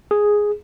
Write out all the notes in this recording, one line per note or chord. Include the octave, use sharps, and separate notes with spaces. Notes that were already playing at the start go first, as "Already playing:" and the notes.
G#4